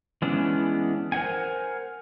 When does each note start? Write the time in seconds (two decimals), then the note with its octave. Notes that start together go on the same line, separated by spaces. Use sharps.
0.22 E3 G#3 B3 C#4 D4
1.12 A#4 C5 E5 F#5 G#5